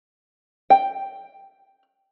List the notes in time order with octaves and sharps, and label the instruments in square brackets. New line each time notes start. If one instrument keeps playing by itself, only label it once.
[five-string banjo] G5